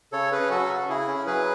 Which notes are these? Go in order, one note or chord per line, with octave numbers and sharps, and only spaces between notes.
C#3 A4 C#5
C#4 G#4 B4
F#3 F#4 A4
C#3
C#3 E4 G#4
C#4
F#3 G#4 B4